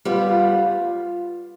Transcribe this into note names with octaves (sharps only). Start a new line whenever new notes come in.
G3 B3 F4
F4
F4